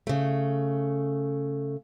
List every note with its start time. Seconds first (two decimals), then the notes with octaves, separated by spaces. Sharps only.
0.07 C#3 A3